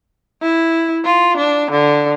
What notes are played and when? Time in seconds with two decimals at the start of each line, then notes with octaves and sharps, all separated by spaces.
0.42 E4
1.05 F4
1.37 D4
1.71 D3